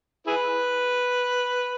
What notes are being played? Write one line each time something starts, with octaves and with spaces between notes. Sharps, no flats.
E4 G#4 B4